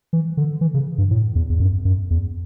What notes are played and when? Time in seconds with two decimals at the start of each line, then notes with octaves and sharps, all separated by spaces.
0.13 E3
0.37 D3
0.61 E3
0.74 C#3
0.98 G2
1.11 A2
1.35 E2
1.50 E2
1.60 F#2
1.85 F#2
2.10 E2